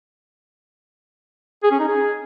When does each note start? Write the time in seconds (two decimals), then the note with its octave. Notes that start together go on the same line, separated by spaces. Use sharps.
1.64 G#4
1.72 C#4
1.80 D#4
1.88 G#4